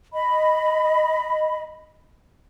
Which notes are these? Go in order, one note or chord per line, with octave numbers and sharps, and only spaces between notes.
D#5 B5